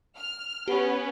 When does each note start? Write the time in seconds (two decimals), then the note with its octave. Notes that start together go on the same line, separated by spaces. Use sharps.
0.17 F6
0.68 B3 C#4 G4